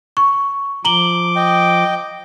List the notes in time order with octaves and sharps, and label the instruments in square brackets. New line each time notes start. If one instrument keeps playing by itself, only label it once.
[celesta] C#6
[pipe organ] F3 D6 [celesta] A#5 F#7 G7
[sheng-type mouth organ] D#5 G5